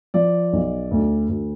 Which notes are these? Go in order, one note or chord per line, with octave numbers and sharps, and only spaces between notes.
F3 D5
B1
D2
D2